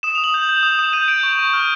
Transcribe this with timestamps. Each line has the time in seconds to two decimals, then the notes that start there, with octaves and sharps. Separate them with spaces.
0.03 D#6 E7
0.15 D#6 F7
0.24 F#7
0.34 G6
0.43 F#7
0.49 G6
0.63 D#6
0.79 D#6 E7
0.93 G6 D#7
1.08 G6 D7
1.23 C#6
1.39 C#6
1.53 F6